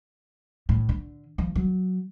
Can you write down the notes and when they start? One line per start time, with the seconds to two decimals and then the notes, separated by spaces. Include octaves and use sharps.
0.69 A2
0.89 D3
1.38 F3
1.55 F#3